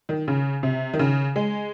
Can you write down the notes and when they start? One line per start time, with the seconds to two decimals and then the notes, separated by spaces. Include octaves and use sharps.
0.09 D#3
0.28 C#3
0.63 C3
0.93 D#3
0.99 C#3
1.36 G#3